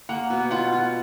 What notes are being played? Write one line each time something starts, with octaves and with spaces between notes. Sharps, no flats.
A#3 F#5
B2
F4 F#5
F4